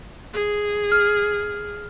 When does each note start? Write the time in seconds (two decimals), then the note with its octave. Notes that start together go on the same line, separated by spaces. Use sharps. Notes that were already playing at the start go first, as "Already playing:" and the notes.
0.33 G#4
0.92 F6